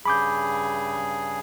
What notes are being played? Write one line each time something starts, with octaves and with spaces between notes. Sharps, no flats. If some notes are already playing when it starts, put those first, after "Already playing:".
G2 C#3 G#4 B5 D6 G6